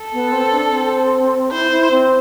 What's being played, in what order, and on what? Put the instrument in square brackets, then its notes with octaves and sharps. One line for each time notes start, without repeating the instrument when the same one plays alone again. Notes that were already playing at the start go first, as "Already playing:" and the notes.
Already playing: [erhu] A4
[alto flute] B3
C4
D4
C4
[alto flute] E4 [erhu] C5
[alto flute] E4
C4